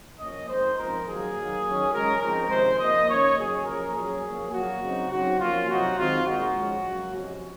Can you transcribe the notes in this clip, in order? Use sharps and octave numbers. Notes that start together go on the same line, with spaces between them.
F3 A#3 C#4 D#5
A#2 G#3 C4 D#4 C5
C#3 F3 C4 D#4 A#4
D#3 F#3 A#3 G#4
D#3 F#3 A#3
D#3 F#3 C#4
C#3 G#3 C#4 A#4
F3 G#3 C4 D#4 A#4
C3 D#3 G#3 C#4 C5
A#2 F3 A#3 D#5
D#3 A#3 C#4 C#5
C#3 F#3 C#4 G#4
F3 A#3 C#4 A#4
A#2 F#3 C#4 G#4
A#2 F3 A#3 C#4
A#2 F#3 A#3 F#4
C#3 F#3 C4 D#4
C#3 F#3 C4 D#4 F#4
F3 A#3 C#4 F4
C3 F#3 C4 D#4 F#4
D#3 G#3 C4 D#4 F4
A#2 G#3 D#4 F#4
F3 G#3 C#4
C#3 F#3 A#3
C3 F3 G#3 C#4